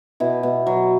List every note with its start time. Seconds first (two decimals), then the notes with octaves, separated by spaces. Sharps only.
0.20 B2 E4
0.43 B2
0.67 F#3